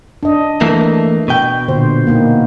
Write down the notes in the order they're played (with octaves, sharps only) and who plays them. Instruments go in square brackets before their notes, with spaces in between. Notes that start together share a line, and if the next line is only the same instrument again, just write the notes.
[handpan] D4 D#5
[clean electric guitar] E3 A3 A#3
B2 G5
[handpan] A#2 D3 C5
A#3 B3 D#4